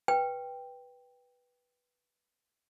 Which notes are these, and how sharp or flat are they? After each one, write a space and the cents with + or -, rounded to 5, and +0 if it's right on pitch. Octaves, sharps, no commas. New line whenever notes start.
B4 -5 G5 +5